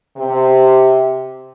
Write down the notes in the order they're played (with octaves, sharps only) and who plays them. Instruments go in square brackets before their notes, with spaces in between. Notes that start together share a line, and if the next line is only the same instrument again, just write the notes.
[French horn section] C3